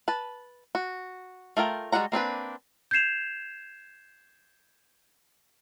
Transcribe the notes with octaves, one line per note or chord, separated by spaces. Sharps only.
B4 A5
F#4
A3 F4 A#4 G5
G3 G#3 F#4 F#5 A#5
A#3 C4 D4 B4
G6 G#6 C7 E7 F7